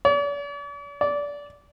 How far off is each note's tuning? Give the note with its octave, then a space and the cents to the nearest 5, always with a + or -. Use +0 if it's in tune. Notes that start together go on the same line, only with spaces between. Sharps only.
D5 -45
D5 -20